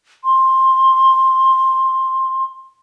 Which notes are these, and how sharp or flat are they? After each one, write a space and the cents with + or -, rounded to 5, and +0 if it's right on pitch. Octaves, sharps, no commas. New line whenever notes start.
C6 +15